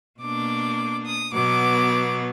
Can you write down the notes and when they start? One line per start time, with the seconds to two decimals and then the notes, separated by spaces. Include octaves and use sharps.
0.21 B2 A#3 D4 D6
1.06 D#6
1.34 B2 F#3 B3 D6